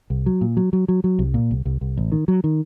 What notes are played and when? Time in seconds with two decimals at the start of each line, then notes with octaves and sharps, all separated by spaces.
0.10 C2
0.26 F#3
0.41 A#2
0.57 F#3
0.73 F#3
0.88 F#3
1.04 F#3
1.19 C2
1.34 A#2
1.51 C2
1.65 C2
1.81 C2
1.97 A1
2.12 D#3
2.28 F#3
2.44 D#3